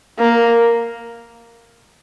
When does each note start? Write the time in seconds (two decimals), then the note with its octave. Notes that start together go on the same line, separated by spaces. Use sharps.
0.19 A#3